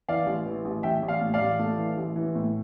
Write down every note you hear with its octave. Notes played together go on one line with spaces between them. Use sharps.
E3 D5 F5
A1
E3
A1
A1 E5 G5
A1
D5 F5
A2
D5 F5
A1
A3
E3
A1
E3
A2